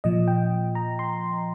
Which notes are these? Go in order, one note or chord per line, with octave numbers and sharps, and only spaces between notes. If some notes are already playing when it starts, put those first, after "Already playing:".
A#2 F3 D#5
G5
A#5
C6